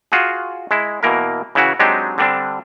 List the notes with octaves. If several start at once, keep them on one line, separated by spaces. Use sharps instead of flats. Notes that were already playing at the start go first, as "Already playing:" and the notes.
F4 F#4 G#4
G#3 E4
B2 E3 A#3 A#4
C#3 E3 E4 F#4
F#3 G#3 C4 D4 D#4 G4
D3 G3 C4 D4